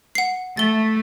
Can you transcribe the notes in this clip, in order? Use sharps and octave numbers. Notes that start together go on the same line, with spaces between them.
F#5 C7
A3 A6 G7